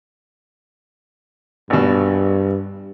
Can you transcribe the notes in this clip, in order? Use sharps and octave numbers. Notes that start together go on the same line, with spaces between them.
G#1 G2 B2